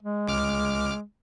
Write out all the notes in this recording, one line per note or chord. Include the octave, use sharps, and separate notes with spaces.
G#3
C#2 D6 F6